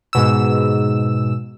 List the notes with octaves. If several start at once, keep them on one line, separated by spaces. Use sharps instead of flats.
G#2 B2 E6